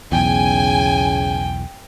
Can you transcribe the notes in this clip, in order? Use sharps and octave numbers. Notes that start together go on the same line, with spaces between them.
B1 E2 C#3 G5 G#5